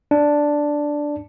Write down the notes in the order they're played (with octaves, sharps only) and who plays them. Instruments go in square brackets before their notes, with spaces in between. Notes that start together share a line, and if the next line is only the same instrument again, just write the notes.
[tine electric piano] D4